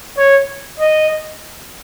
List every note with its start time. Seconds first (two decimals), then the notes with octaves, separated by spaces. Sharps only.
0.18 C#5
0.80 D#5